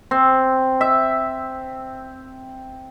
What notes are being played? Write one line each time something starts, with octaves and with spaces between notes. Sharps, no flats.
C4
E5